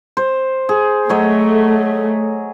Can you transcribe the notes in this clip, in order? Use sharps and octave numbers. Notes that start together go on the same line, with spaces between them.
C5
G#4
F#3 A3 C#5 D#5